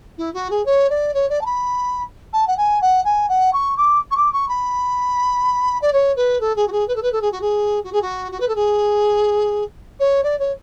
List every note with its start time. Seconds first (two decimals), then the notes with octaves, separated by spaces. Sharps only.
0.18 E4
0.34 F#4
0.50 G#4
0.65 C#5
0.90 D5
1.14 C#5
1.29 D5
1.41 A5
1.45 B5
2.33 A5
2.47 F#5
2.57 G#5
2.81 F#5
3.05 G#5
3.29 F#5
3.53 C#6
3.77 D6
4.11 C#6
4.17 D6
4.32 C#6
4.48 B5
5.81 D5
5.93 C#5
6.16 B4
6.40 A4
6.56 G#4
6.67 F#4
6.72 G#4
6.88 B4
6.95 A4
7.02 B4
7.12 A4
7.21 G#4
7.32 F#4
7.41 G#4
7.84 F#4
7.92 G#4
8.02 F#4
8.32 F#4
8.40 B4
8.48 A4
8.55 G#4
9.99 C#5
10.23 D5
10.39 C#5